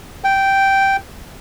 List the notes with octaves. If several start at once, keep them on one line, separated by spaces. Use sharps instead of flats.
G5